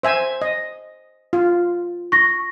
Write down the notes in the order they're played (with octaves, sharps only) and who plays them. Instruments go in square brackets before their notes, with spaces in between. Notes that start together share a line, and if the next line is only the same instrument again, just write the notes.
[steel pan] C5 E5 G#5
D#5
F4
[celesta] C#6 A#6